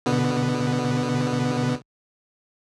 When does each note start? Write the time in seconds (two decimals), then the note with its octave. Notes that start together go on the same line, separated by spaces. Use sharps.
0.06 B2 D3 B3